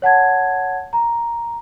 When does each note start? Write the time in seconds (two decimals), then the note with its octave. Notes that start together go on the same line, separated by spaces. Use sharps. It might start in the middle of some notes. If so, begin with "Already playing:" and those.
0.02 C#5 F#5 A5 G#6
0.93 A#5